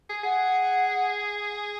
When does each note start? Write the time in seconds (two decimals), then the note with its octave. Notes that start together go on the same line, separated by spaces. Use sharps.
0.10 G#4
0.23 G#4 F#5